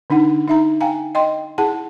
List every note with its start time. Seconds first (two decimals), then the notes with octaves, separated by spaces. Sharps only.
0.10 D3 D4 D#4 F#5
0.48 D#4 E5 A#5
0.81 F5 G5 G#5 A#5
1.15 D#5 G5 C6
1.58 E4 G#4 F#5 A5